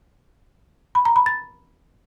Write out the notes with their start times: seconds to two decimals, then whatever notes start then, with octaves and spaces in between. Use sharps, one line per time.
0.95 B5
1.05 A#5
1.16 B5
1.26 A6